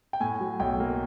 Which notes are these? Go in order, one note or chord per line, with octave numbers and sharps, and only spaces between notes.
G5
A2 G#5
F#3
B1 G5
A#3